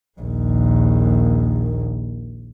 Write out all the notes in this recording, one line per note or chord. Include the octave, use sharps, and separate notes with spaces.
A#1 D#2